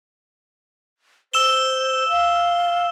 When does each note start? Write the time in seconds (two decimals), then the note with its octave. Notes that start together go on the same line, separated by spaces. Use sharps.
1.34 C5 E6 E7 G7
2.09 F5